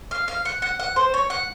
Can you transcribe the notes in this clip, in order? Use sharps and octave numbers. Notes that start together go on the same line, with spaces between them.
F5
F5
F#5
F#5
F#5
C5
C#5
F#5